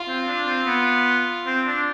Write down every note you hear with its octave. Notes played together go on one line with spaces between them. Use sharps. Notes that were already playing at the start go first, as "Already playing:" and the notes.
Already playing: F4
C4
D4
C4
B3
C4
D4